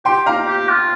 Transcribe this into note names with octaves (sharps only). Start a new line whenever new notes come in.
G4 G5 C6
G4 F5 A#5
G4
F4